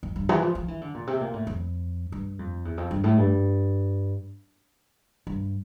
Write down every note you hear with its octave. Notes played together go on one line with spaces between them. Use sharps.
F2
G2
E3
F3
F3
E3
D3
A#2
C3
A#2
A2
F2
G2
F2
E2
F2
G2
A2
G2
G2